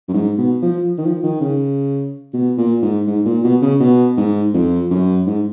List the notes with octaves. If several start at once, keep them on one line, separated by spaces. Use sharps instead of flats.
F#2
G#2
B2
F3
D#3
F3
D#3
C#3
B2
A#2
G#2
G#2
A#2
B2
C#3
B2
G#2
F2
F#2
G#2